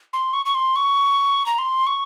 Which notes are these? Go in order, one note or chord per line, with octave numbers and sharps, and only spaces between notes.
C6
C#6
C#6
C6
C#6
A#5
C6
C#6